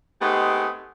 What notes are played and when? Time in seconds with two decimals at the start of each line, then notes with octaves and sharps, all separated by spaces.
0.21 G#3 A3 B3 C4 D#4 G4